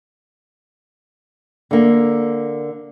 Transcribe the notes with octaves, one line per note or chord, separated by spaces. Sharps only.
D3 A#3